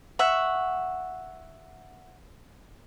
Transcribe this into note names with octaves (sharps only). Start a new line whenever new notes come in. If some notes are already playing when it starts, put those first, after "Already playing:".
E5 F#5 C#6